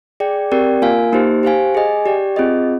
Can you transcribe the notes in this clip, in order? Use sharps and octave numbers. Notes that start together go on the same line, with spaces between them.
G#4 D5 G5
C4 G4 A#4 D5 G5
A#3 F4 A#4 F5 G#5
A#3 D#4 G4 C5
G4 C5 F5 G#5
G#4 D#5 G#5
G4 D5 G5
C4 F4 G#4 D#5